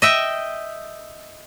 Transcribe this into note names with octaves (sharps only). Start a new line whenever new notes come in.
D#5 E5 G5